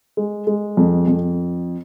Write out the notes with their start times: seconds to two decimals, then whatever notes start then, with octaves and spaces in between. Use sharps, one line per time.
0.17 G#3
0.47 G#3
0.77 F2
1.08 F2